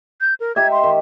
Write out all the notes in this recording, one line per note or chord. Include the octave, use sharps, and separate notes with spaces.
G6
A#4
D#4 G4 E5 G#6
C6
D#3